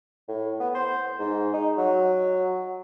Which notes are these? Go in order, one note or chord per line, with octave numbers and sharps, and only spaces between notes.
A2
B3
C5
G#2
D#4
F#3